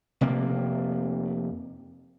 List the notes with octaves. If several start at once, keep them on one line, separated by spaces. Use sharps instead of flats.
F1 C3 A#3